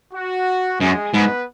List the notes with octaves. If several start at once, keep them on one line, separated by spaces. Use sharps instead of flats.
F#4
F#2 G#3 G#4
G#2 B3 B4